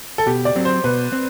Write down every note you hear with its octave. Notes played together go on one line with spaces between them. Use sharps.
A4
B2 G4
D5
F#3 C4
C5
B2 B4
C4